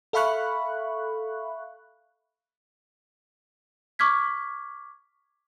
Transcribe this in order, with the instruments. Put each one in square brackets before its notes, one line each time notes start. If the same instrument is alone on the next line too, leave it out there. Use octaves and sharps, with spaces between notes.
[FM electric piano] A4 E5 F5 B5 C#6 F#6
[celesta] C#6 D6 F6 G#6 B6